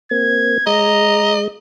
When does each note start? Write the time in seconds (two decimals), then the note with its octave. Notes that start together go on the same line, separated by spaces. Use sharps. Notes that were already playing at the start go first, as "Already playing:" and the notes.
0.11 A#3 C4 G#6
0.67 G#3 D#5 A#5